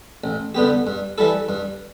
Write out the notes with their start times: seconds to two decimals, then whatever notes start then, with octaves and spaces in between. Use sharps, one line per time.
0.24 A1
0.55 G2 D3 B3 G4
0.87 G2
1.18 E3 G3 E4 A4
1.49 G2